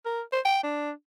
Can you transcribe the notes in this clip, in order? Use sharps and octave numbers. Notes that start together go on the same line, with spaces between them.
A#4
C5
G5
D4